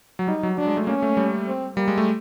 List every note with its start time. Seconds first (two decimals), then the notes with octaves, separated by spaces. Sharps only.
0.19 F#3
0.27 G3 D#4
0.43 F#3
0.57 F#3 D4
0.67 G#3
0.77 A3
0.87 A#3 C#4
1.02 A3
1.17 G3
1.47 C4
1.77 G3 A#3
1.88 G#3
1.98 A3